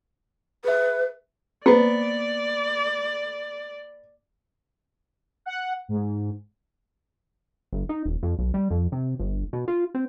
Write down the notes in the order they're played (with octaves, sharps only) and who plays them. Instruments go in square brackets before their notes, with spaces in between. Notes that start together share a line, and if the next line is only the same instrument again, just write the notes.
[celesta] G#4 E5 [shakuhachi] B4
[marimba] A#3 C5 [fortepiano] B3 [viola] D5
[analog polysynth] F#5
G#2
[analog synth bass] G1
D#4
D#1
F2
B1
G3
F2
C3
G1
B2
F4
C4